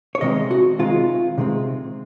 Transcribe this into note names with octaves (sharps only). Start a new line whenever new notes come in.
C#5
C3 D#3 G#3 C4 D#5
F#4
C3 D#3 G#3 C4 F4
C3 D#3 G#3 C4